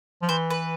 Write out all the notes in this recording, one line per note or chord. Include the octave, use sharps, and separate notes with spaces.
F3
E3 C5
B4